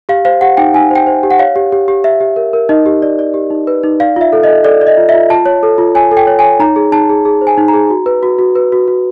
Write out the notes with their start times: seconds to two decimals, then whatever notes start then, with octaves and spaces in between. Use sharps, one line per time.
0.09 G4 F5
0.25 C5 F5
0.41 G4 F#5
0.57 D#4 G5
0.74 D#4 G#5
0.91 C5 G5
1.07 C5
1.23 G4
1.31 F#5
1.39 C#5 F5
1.56 G4
1.72 G4
1.88 G4
2.04 G4 E5
2.21 G4
2.36 A#4
2.53 A#4
2.69 D#4 D#5
2.86 G4
3.02 D5
3.19 D5
3.34 G4
3.51 D#4
3.67 B4
3.83 D#4
4.00 D5 F5
4.16 F4 E5
4.33 A4
4.43 A4 D#5
4.65 A4 D5
4.81 D5
4.87 D#5
4.98 F4
5.09 F4 E5
5.30 F4 A5
5.46 C#5
5.63 A4
5.78 F4
5.95 C#5 G#5
6.11 A4
6.17 G5
6.27 C#5
6.39 C#5 G#5
6.60 D#4 A#5
6.76 G#4
6.92 D#4 A5
7.09 G#4
7.25 G#4
7.41 C5
7.47 G#5
7.58 D#4
7.68 A#5
7.73 G#4
7.90 F#4
8.06 B4
8.23 F#4
8.39 F#4
8.55 B4
8.72 F#4
8.88 F#4